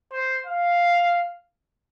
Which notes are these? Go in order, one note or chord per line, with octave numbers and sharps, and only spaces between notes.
C5
F5